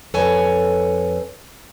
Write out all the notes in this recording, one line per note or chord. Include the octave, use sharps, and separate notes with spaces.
F2 A4 B4 C#5 G#5